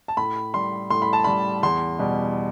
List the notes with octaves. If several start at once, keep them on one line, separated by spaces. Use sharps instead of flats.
A5
A2 B5
G3 C6
A2 C6
B5
A5
G3 B5
E2 C6
B2 G3